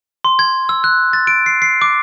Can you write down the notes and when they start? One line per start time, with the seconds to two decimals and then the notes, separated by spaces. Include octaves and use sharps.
0.25 C6
0.39 G#6
0.69 E6
0.84 F#6
1.13 A6
1.27 D7
1.46 C7
1.62 C7
1.82 D6